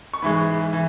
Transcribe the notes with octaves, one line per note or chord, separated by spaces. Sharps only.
C#6
G#2 E3 G#3 B5
E3